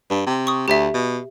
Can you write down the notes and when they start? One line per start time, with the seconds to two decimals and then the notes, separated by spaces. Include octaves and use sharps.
0.10 G2
0.27 C3
0.47 C#6 D#6
0.68 D2 G4 E5
0.94 B2